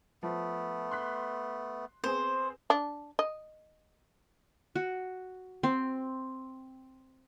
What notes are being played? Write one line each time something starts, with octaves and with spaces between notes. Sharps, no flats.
F3 A3 B3
C6 F#6 B6
B3 C4 G#4 C5
D4
D#5
F#4
C4